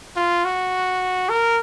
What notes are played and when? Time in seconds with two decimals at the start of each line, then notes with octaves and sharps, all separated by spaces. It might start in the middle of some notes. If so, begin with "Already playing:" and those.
0.16 F4
0.45 F#4
1.29 A#4